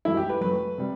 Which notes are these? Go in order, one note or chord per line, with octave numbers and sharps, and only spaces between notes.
F#2 E3 A3 E4
G4
B4
F#2 F#3 A3 B4
C3 G3